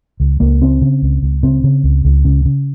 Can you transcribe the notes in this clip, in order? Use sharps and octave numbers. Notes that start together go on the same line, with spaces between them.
C#2
C#2 A#3
C#3 C4
C#3
C#2
C#2
C#3 C4
C#3
C#2
C#2
C#3
C#3